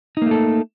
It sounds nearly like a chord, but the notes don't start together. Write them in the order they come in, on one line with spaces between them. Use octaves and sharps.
D#4 A#3 A3 A4